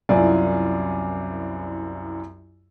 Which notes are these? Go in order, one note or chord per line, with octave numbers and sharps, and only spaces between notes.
C2 F#2 E4 F4 D5 G#5